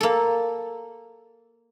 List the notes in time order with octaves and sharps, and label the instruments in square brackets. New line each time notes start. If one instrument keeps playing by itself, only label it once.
[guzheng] A#3 A4